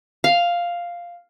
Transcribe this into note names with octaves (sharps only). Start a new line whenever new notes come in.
F5